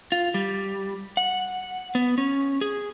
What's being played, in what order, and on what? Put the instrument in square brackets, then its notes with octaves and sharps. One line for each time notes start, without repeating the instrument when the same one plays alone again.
[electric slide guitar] F4
G3
F#5
B3
C#4
G#4